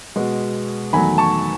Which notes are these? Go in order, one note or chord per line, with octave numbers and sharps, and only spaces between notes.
B2 G#3 B3
E2 D#3 F#3 A3 G#5 B5
A5 C#6